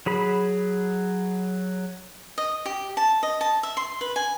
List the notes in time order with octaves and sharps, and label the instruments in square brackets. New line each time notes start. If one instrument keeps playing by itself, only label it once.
[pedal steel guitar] F#3 G#4 B5
[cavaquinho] D#5
G4
A5
D#5
A5
E5
C6
B4
G#5